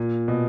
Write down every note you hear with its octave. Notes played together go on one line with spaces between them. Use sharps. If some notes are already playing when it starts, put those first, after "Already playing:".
Already playing: A#2
B2